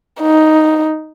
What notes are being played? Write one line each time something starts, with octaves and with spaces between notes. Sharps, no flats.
D#4